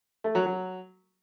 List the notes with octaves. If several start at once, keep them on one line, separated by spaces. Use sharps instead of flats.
A3
F#3
F#3